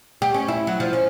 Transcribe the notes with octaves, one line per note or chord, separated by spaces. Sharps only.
G4
C#4
E4
F#3
F3
C#4